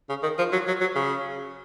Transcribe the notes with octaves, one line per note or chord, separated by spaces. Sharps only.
C#3
D#3
F3
F#3
F#3
F#3
C#3